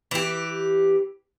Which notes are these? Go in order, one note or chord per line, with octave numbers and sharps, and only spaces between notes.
E3 G4